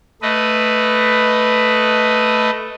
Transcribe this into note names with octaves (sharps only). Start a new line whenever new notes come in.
A3 B4 D#5